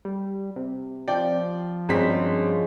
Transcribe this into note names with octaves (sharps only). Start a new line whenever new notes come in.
G3
C3
F3 D5 G5
G#1 G2 G#3 C4 C#4 B6